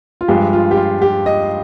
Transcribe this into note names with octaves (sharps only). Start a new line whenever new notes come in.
F4
G2 F3 G#3 G4
F4
G4
F4
G4
D#5